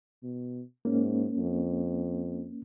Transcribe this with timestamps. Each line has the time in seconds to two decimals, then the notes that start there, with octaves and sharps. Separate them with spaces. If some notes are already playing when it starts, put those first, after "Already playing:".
0.23 B2
0.85 G#2 A#3 C#4
1.38 F2